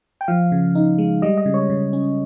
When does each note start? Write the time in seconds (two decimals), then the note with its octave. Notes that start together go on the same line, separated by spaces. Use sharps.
0.21 G5
0.28 F3 F5
0.52 C#3
0.75 D#4
0.98 G#3
1.22 G3 D#5
1.37 D#5
1.46 C#3
1.54 C#5
1.70 C#3
1.93 C#4